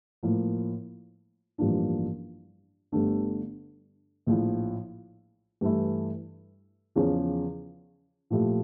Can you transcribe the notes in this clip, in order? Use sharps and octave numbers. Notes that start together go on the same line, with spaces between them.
A2 F3 A#3
A1 G2 F3 A#3 D4
G1 G2 D3 A3 D4
A#1 A2 F3
G2 E3 A3 E4
E2 C#3 F3 C#4
A#2 F3 A3 E4 G4